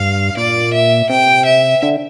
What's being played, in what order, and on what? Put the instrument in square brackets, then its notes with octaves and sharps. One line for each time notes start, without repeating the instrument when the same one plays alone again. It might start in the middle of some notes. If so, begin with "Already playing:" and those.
Already playing: [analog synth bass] G2 [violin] F5
[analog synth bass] A#2 [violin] D5
[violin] E5
[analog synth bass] C3 [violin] G5
[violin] E5
[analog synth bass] D3